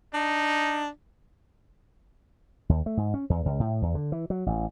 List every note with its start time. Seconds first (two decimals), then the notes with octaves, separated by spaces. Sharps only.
0.14 D4 D#4
2.69 D#2
2.86 A3
2.97 G#2
3.14 C#4
3.30 E2
3.45 C#2
3.60 A2
3.82 E2
3.95 D3
4.12 E3
4.30 F#3
4.46 A1